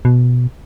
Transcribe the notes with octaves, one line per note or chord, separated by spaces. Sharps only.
B2